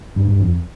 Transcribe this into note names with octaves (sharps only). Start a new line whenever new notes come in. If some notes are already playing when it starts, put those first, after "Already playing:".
G2
G2
F2